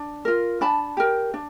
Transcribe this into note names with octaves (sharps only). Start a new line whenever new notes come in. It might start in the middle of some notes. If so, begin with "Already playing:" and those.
Already playing: D4
F4 A#4
D4 A5 B5
G4 A#4
D4